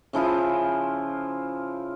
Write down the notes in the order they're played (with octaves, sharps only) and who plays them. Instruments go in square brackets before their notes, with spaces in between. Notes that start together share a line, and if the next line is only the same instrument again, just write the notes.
[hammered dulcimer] C#3 F3 E4 F4